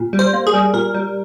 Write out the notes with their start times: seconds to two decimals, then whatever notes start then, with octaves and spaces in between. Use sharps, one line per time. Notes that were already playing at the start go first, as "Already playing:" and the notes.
Already playing: A#2
0.13 G3
0.19 C5
0.33 A#3
0.47 G#4
0.54 G3
0.74 A#2 A#4
0.94 G3